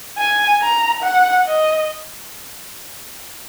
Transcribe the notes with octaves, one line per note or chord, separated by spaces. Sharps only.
G#5
A#5
F#5
D#5